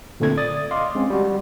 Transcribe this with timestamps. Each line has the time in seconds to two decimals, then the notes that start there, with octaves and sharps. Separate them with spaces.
0.20 A#2 D3 A3 C4 A4 G#6
0.37 D5 D#6 A6
0.71 D#5 F5 C6 D6
0.95 G#3 C4 C#4
1.10 G3 F#4